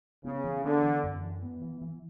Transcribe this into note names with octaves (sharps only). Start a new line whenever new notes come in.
C#3 B3
E3
D3 B3
E3
F#2
E3
B3
E3
E3